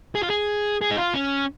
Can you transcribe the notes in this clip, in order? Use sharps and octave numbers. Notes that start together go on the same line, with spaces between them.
G#4
F4
G#4
G#4
D#4
F4
C#4